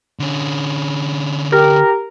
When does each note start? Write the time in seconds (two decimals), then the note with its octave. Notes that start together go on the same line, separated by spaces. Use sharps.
0.20 D3 C#4
1.52 G4 A#4